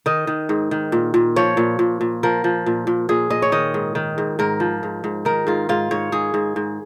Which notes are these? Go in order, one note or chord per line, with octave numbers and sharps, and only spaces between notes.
D#3 D#5
D#3
G#2
D#3
A#2
A#2
F3 C#5
A#2
A#2
A#2
F3 A#4
F3
A#2
A#2
A#2 G#4
A#2 D#5
C#5
D#3 D#5
G#2
D#3
G#2
G#2 A#4
F3
G#2
G#2
D#3 A#4
G#2 F4
G#2 F4
G#2 C#5
G#2 G#4
G#2
G#2